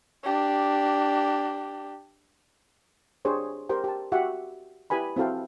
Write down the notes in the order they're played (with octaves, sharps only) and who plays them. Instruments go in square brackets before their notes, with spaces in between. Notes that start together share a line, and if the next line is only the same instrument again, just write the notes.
[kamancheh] D4 G4
[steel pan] D4 G4 G#4 C5 C#5
G4 A#4 C5 G5
G4 A5
F#4 G4 E5 F#5
E4 G4 B4 G#5 B5
C4 E4 F#4 A4 F5 G5